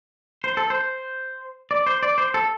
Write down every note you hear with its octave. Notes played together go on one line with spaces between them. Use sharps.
C5
A4
C5
D5
C5
D5
C5
A4